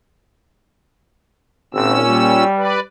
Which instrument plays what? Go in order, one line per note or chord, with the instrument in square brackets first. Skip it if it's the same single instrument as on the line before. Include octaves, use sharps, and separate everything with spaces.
[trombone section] G#1 [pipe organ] A#2 C#4 E6
[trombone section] G3
[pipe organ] B4 D5